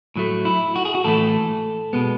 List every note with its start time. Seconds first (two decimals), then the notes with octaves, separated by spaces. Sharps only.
0.16 A2 F#3 A3
0.45 E4
0.76 F#4
0.85 G#4
0.95 F#4
1.04 A2 E3 A3 A4
1.93 B2 G#3 B3